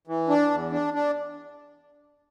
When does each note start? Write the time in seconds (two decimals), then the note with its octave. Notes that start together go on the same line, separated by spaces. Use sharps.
0.07 E3
0.29 D4
0.50 E2
0.72 D4
0.94 D4